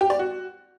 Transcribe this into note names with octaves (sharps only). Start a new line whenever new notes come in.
G4
D5
F#4